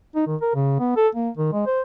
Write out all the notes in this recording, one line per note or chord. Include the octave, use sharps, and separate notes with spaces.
D#4
D#3
A#4
C#3
B3
A4
A#3
D#3
G#3
C5